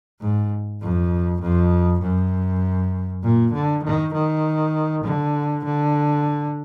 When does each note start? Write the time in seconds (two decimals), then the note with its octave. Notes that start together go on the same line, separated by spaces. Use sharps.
0.21 G#2
0.81 F2
1.41 F2
2.02 F#2
3.23 A#2
3.53 D3
3.83 D#3
4.14 D#3
5.04 D3
5.65 D3